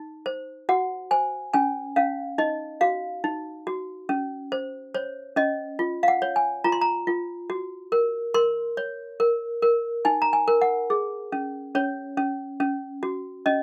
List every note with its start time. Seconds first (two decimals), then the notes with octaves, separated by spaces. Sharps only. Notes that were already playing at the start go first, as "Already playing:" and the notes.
Already playing: D#4
0.26 C5
0.69 F#4 F#5
1.11 C5 G#5
1.53 C#4 G#5
1.96 C#4 F5
2.38 D#4 D#5
2.81 F#4 F5
3.24 D#4
3.67 F#4
4.09 C#4
4.52 C5
4.94 C5 C#5
5.36 C#4 D#5
5.79 F4
6.03 F5
6.08 F#5
6.22 C#5
6.36 G#5
6.64 F4 A#5
6.72 C6
6.81 A#5
7.07 F4
7.50 F#4
7.92 A#4
8.34 A#4 C6
8.77 C#5
9.20 A#4
9.62 A#4
10.05 D#4 G#5
10.22 A#5
10.33 G#5
10.48 A#4
10.62 F#5
10.90 G#4
11.32 C#4
11.75 C#4 C#5
12.17 C#4
12.60 C#4
13.03 F#4
13.46 C#4 D#5